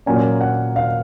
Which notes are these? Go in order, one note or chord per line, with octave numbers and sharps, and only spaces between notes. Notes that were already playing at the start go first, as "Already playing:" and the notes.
A#2 F#3 A#3 C#4 G#5
F#5
F5